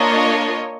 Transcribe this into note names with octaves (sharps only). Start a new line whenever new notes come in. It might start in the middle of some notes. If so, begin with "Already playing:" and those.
Already playing: A#3 D4 F4 C#5 D#5